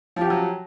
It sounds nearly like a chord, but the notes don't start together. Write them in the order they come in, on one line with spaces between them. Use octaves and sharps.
F3 G4 F#4 F#3